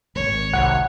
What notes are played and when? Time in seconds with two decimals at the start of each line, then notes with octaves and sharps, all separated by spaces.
0.15 D1 G#1 C#5
0.53 C2 F#5